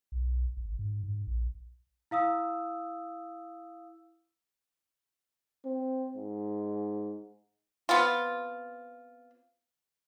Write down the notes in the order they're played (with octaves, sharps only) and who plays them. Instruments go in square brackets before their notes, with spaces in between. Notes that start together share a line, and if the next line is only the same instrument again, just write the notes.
[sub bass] B1
G#1
G#2
G#2
A#1
[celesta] E4 F5 D#6 E6
[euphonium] C4
G#2
[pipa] B3 C4 F4